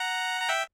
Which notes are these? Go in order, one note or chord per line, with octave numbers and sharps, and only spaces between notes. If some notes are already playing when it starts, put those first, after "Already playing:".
Already playing: F#5 A#5
A#5
E5 G5